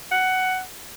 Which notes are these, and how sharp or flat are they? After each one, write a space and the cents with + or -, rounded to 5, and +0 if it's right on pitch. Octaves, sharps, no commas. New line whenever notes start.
F#5 +10